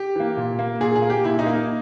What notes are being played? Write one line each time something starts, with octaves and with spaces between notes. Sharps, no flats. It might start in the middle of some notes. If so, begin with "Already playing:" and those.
Already playing: G4
E3 A#3
A#2
A#3
A#2 G#4
G#4
A#3
G4
A#2 E4
D#4
A#3
D#4